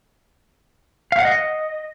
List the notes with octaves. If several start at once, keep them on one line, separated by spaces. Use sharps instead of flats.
F5
F#5
D#5